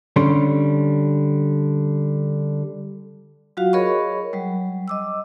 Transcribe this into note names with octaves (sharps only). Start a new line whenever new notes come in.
D3 G3 C#4 C6
F#3 F4 F#4 F5
G#4 A#4 C#5 D#5 B5 C#6
F#3 G3
D#5 D6 E6